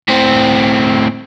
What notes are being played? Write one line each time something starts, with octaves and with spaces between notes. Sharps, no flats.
A2 C4